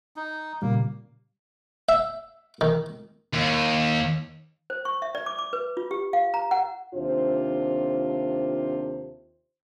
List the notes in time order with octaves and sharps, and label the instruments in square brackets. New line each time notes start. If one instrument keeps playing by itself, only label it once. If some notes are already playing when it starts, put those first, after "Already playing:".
[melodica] D#4
[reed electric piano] A#2 C#3 G3 [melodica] A#3
[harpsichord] E5
D#3
[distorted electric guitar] D#2
[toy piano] C5
C#6
E5
D5
D6
D6
B4
F4
G4
F5
A#5
F#5
[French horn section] D#2 C3 D4 F4 C5